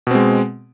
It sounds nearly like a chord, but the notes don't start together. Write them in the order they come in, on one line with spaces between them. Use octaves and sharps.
B2 C4 G#3